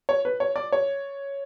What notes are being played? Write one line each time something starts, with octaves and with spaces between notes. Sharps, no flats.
C#5
B4
C#5
D5
C#5